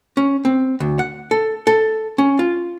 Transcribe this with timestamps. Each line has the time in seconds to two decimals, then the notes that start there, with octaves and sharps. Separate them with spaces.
0.17 C#4
0.45 C4
0.80 D2
0.99 F#5
1.31 A4
1.67 A4
2.18 C#4
2.39 F4